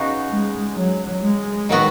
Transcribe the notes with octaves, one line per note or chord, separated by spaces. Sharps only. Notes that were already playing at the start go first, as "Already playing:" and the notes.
Already playing: C#3 B3 D#4 F#4
G#3
F#3
G#3
D#3 F#3 B3 F#4